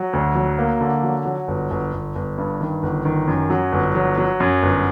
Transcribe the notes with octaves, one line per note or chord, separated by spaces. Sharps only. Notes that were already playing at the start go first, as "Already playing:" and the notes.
Already playing: F#3
D2
F#3
A#3
D3
F#3
F#3
G1
G1
G1
G1
G2
D#3
G1
D#3
F#2
F#3
G1
F#3
F#3
F#2
G1